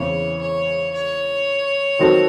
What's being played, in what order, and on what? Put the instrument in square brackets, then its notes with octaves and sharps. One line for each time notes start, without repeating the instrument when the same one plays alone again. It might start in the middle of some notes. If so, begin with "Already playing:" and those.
Already playing: [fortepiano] E2 C#3 E3 C4 [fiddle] C#5
[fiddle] C#5
C#5
[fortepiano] D#3 F#3 C4 F#4 A4